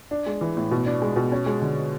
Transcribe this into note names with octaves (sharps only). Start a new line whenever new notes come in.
D4
G#3
E3
A2
B2
D4
G#3
B2
C#4
G#3
D3